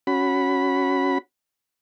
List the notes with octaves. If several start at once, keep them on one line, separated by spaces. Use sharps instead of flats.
C#4 F#4 B5